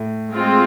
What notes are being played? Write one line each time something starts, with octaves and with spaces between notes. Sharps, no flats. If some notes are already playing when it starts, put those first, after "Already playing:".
Already playing: A2
G#3 C4 F4